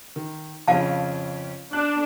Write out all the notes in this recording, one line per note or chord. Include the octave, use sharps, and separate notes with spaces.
D#3
F2 C#3 C#4 F5 A5
D4 F#6